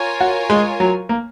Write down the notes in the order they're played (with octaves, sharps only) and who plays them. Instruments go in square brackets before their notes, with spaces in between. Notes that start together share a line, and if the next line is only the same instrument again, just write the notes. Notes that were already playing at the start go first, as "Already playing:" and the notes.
Already playing: [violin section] F4 A#4 C#5 G#5
[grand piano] F#4
G#3
F#3
A#3